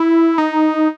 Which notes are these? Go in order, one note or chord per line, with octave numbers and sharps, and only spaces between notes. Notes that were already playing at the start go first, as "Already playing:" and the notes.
Already playing: E4
D#4